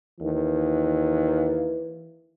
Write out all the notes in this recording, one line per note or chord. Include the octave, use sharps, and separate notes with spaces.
D#2 E3